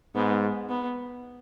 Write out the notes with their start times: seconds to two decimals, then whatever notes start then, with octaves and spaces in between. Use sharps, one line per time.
0.15 G#2 B3
0.69 B3